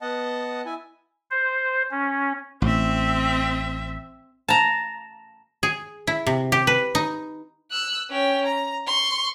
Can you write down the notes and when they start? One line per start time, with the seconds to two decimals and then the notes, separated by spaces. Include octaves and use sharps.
0.01 B3 D#5 F#5 A5
0.66 E4 G#5
1.31 C5
1.91 C#4
2.62 A1 C4 E5
4.48 A5 A#5
5.63 G#4
6.07 E4
6.27 C3
6.52 G4
6.67 B4
6.95 D#4
7.71 E6 F#6
8.10 C#4 G5
8.46 A#5
8.87 C6 C#6